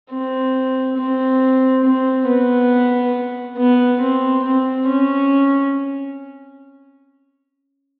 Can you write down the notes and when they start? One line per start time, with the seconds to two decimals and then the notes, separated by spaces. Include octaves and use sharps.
0.11 C4
0.97 C4
1.84 C4
2.27 B3
3.57 B3
4.01 C4
4.43 C4
4.87 C#4